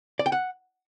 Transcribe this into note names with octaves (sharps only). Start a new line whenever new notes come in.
D5
G5
F#5